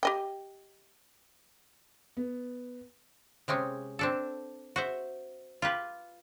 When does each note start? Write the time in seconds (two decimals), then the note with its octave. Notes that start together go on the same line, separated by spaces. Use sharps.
0.03 G4 D#5 G5
2.17 B3
3.48 C3 G#3 C4 C#4
3.99 C4 D4 A4
4.76 F#4 C5 E5
5.62 F4 G4 B4